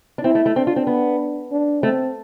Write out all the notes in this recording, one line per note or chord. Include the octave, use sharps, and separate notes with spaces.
D4
C4 E4
A3
A3
C4 D4
F4
C4
B3
D4
A3 C4